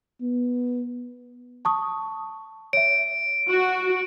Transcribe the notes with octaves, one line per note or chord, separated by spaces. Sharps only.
B3
A5 C#6 D#6
C#5 E5 D7
F#4